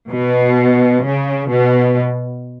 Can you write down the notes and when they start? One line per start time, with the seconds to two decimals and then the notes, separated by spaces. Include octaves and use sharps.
0.10 B2
1.04 C#3
1.50 B2